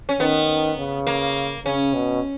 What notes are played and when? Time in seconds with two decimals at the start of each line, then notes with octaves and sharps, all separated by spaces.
0.09 C#4
0.20 D#3 B3
0.78 C#3
1.07 A#3
1.65 C#3 C#4
1.94 B2